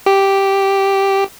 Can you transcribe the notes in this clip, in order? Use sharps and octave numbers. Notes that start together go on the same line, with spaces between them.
G4